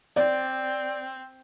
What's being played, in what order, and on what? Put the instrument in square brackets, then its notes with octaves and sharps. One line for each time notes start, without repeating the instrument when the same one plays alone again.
[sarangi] C4 [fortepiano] D5